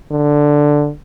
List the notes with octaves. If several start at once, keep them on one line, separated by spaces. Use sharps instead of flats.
D3